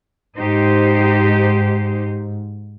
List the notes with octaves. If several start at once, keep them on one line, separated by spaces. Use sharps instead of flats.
G#2 D#4 G4 C5